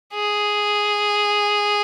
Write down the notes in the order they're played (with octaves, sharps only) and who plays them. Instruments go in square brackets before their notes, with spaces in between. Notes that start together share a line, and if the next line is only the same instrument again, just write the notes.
[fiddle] G#4